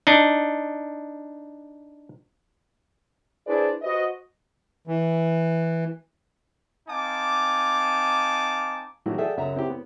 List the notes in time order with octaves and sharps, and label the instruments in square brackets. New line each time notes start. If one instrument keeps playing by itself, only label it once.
[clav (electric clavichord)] D4 D#4
[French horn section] D4 E4 G#4 B4 C5 D5
F#4 B4 C5 D#5
[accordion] E3
[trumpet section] C4 D#4 F5 G#5 A5 D6
[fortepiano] A2 D#3 E3 F#3 F#4 G4
G#4 A4 D5 E5 F#5 G5
C#2 F#2 E5 F#5 A#5
C4 E4 G4
B3